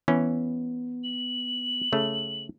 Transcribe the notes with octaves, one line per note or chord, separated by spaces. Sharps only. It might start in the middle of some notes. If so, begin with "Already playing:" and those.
E3 B3 C#4
F#7
C#3 A3